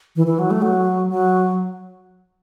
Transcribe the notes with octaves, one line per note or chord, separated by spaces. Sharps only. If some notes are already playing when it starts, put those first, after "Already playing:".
E3
E3
F#3
A3
F#3
F#3